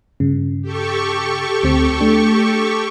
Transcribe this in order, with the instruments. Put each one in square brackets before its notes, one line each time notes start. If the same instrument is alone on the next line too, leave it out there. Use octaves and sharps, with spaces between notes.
[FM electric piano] G2 C#3
[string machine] G4 A4 C#6
[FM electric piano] D2 C4
A3 D4